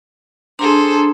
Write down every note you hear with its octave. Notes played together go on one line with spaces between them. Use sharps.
D4 G#4 A4 C5 A#5 C6